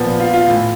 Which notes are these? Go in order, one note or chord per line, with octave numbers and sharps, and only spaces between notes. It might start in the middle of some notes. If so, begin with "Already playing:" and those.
Already playing: A#2 F3 B3
F4
F4
A2 E3